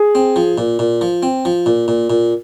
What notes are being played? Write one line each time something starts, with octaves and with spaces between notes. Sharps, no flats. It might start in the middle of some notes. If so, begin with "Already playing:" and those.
Already playing: G#4
C4
F3
A#2
A#2
F3
C4
F3
A#2
A#2
A#2